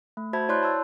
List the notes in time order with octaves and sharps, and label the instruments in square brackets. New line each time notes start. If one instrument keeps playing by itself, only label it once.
[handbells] A3
F#4 C5 E5 A5 B5 G#6
E4 C#5 D5 C6 F#6 G6
A5 E6